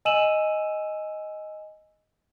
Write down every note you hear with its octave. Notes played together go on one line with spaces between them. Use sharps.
D#5 G#5 E6 D#7 E7 F#7